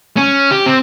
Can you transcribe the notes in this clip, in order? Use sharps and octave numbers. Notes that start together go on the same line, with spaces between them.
C#4
G4
C4